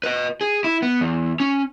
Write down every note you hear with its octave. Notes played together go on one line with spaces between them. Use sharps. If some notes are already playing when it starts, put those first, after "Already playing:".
B4 D#5
G#4
E4
B3
E2
C#4